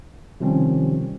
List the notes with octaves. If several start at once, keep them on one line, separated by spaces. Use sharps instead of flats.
C3 D#3 F3 G3 C4 C#4